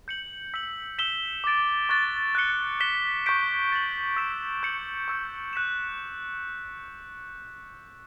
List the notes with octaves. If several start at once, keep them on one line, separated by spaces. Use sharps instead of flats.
G6 C#7 F#7
E6 B6 F#7
E6 B6 E7 G7
D6 A6 D7
C#6 F#6 A6
F#6 A6 C#7 G7
F#6 B6 E7 G7
C#6 G6 B6 D7
A6 D7 F#7
E6 B6 E7
C#6 G6 C#7 F#7
C#6 E6 G6
F#6 B6 E7